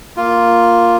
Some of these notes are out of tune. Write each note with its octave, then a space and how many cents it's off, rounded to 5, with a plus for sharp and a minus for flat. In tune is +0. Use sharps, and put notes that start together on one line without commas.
A#3 +0 F4 +0